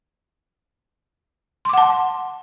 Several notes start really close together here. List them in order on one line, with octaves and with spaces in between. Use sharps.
C6 D6 F#5 A5